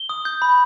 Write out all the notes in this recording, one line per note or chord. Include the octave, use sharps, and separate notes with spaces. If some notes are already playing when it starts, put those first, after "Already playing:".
Already playing: G7
D#6
G6
B5